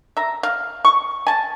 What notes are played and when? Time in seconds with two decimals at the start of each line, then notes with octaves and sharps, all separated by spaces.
0.17 E5 A#5
0.43 F5
0.85 C#6
1.27 G#5 A5